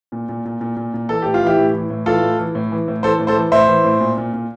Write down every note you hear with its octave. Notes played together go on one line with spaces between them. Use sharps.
A#2
A#2
A#2
A#2
A#2
A#2
E3 A4
A2 G4
F4
E3 E4 G4
A2
E3
A2
E3 F4 A4
A2
E3
A2
E3
A2
E3 A4 C5
A2
A4 C5
E3
A2 C5 E5
E3
A2
A#2
A#2
A#2